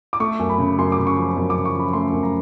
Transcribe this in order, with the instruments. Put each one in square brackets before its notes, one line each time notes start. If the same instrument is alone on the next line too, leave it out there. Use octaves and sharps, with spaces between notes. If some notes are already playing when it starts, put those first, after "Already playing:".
[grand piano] D6
A3 C#6
F#2
B5
C#3
F#2 C6
D6
C#3
C#6
F3
F#2
D6
C#3
C#6
F3 B5
A3 C6
F#2
A#5